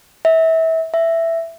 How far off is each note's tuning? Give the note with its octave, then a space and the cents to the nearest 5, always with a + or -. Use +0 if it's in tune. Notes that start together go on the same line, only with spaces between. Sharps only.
E5 -25
E5 +5